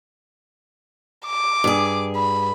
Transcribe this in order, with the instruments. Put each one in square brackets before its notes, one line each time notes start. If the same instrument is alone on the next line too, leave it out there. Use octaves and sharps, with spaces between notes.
[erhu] D6
[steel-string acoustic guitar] G2 G#4
[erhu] B5